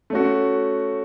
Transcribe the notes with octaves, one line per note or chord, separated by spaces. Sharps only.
A3 C#4 F#4